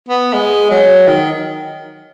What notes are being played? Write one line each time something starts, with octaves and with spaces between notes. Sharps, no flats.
B3
G#3
F#3
D#3